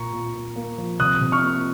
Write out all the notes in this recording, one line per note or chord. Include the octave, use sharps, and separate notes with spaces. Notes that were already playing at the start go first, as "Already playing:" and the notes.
Already playing: A#2 A#3 A#5 C#6
A#2
A#2
A#3
F3
C3 D#6 F#6
C3
C#6 F6
A#3